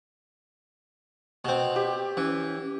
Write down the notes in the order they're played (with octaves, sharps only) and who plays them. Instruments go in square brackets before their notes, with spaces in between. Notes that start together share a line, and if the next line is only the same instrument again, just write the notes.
[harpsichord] B2 C4
[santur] G4
[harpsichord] E3 [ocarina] C#4